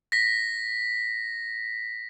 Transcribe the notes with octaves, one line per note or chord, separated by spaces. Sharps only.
A#6 B6